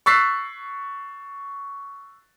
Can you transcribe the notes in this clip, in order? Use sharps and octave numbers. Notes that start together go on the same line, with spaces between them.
C#6 E6 F#6 A6 B6 C7